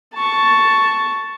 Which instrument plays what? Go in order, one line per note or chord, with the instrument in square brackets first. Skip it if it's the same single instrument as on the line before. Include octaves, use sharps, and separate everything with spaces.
[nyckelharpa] A5 C#6